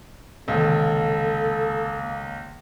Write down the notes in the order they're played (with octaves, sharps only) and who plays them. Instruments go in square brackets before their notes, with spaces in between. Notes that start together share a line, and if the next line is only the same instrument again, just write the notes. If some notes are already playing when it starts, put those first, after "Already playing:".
[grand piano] C#2 [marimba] C3 D#3 E3 [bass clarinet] A#3 [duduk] A4